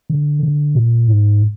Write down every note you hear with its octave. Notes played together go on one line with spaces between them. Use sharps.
D3
D3
A#2
G#2